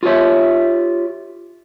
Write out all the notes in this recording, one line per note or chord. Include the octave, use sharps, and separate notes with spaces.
F4 G4 A#4 C#5 E5